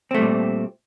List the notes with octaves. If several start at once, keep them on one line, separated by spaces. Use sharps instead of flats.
A#2 G3 A3 C4